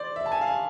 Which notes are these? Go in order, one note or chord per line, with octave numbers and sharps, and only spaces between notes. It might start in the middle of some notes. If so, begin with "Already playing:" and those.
Already playing: C5 D5
E5
A5
G#5
F5
G#5